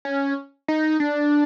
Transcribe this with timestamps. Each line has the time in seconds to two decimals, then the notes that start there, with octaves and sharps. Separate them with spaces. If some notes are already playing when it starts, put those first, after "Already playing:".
0.05 C#4
0.68 D#4
1.00 D4